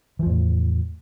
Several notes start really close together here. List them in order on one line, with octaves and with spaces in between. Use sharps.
E3 F3 E2 A2